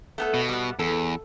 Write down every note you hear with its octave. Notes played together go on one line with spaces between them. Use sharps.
A3 B3 A4
B2
G3 B3
E2 A4